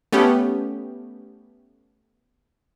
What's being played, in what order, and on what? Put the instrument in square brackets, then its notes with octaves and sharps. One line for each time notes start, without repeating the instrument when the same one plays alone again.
[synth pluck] A3 B3 C#4 G4